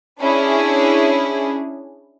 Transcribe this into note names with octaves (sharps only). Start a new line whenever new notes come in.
C#4 D4 E4 G#4